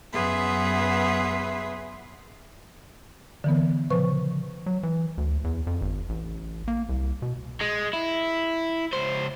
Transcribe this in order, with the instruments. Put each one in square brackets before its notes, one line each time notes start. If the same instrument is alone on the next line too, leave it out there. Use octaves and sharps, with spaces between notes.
[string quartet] F#2 B3 G#4 B4 E5 C6
[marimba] D3 E3 B3
A#2 C#3 F3 B4 C5 C#6
[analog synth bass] F#3
E3
D2
E2
F2
G1
A1
A#3
C2
B2
[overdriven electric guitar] G#3
E4
C#2 C5